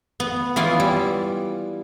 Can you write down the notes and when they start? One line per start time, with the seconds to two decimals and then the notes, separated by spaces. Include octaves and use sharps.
0.20 B3
0.56 E3 B3 E4 F4
0.80 G3